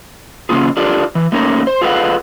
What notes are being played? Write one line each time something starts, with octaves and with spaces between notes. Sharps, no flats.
C#3 A#3 C#4 F4 G#4
D4 F4 G4 A4 A#4
E3
A3 A#3 C#4 D#4 A#4
C5
F4 G#4 A4 B4 F5 F#5